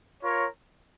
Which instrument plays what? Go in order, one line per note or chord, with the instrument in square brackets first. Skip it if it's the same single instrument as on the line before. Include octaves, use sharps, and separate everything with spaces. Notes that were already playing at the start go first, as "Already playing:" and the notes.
[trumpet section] F4 A#4 C#5